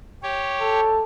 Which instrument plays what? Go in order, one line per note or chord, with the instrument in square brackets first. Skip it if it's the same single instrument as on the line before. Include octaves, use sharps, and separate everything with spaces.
[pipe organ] G4 C#5
[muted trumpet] A4